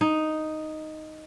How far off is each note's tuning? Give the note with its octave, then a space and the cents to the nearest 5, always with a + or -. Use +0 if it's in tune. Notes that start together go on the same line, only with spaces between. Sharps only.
D#4 +0